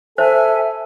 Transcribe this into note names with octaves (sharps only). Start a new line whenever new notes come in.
A4 C5 E5 G#5